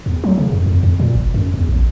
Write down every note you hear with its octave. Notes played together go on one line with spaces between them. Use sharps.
E2
F#3
C#3
F2
F2
F2
A#2
G1
F#2
E2
A1